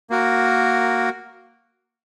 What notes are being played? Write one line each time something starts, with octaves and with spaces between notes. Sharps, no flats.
A#3 F#4 A#4